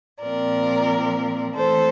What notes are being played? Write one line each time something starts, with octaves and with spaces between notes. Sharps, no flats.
A#2 F3 C4 A#4 D5
E3 A3 C4 A4 C5